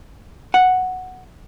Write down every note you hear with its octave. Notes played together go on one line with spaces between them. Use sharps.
F#5